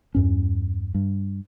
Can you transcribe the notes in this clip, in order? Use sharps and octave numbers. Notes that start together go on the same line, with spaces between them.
E2 G2 C#4
G2